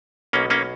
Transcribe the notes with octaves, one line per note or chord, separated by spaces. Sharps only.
B1 B2 A#3 C#4
A#3 C#4